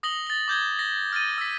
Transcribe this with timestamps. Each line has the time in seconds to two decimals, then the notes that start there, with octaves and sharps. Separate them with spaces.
0.03 D#6 A#6 F#7 G7
0.27 A6 G7
0.48 D6 G6 G#6 G7
0.79 A#6
1.12 F6 A6 D#7
1.38 E6 B6